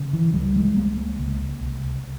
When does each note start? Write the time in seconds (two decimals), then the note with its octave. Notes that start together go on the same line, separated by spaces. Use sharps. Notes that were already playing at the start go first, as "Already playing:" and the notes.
Already playing: C#3
0.13 E3
0.34 C#2 G3
0.56 G#3
0.76 C#2 A#3
1.19 C#2
1.61 C2